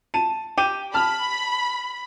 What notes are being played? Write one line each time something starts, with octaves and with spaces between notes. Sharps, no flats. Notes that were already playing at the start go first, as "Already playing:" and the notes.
A5 D#7
G4 D#7
A5 B5 F6